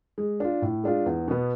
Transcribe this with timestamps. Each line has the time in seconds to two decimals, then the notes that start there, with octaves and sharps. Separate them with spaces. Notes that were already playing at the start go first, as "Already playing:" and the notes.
0.18 G#3
0.40 D4 F4
0.62 A2
0.84 G#3 D4 F4
1.06 E2
1.28 B2 B3